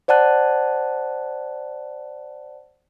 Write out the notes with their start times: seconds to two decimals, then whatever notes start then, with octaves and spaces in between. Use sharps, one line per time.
0.08 C5 D5 F#5 A5 F#6